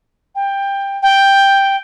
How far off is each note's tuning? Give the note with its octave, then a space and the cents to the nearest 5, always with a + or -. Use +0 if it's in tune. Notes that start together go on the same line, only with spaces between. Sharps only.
G5 +15
G5 +5